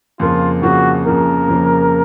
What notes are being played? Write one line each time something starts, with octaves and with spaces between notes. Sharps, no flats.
F2 C#3 F3 A#3 F4
F2 C#3 F3 A#3 F#4
F2 C#3 F3 A#3 A#4
F2 C#3 F3 A#3